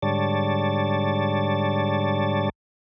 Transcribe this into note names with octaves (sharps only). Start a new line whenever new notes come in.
G#2 D3 G3 C#5 D5 A5